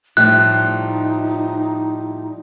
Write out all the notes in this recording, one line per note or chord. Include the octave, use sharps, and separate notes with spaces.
A2 F3 G3 D#4 F#6